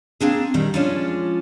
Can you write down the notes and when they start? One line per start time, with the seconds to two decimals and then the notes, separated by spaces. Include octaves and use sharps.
0.20 A#3 C4 D4 G#4
0.54 A#2 D#3 G3
0.74 F3 G#3 C#4 D4 F4